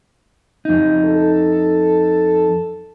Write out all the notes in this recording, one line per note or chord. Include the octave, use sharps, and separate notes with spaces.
F2 D#4
A4